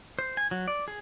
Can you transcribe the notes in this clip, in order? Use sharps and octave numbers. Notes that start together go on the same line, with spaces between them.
C5
G#5
F#3
D5
G#4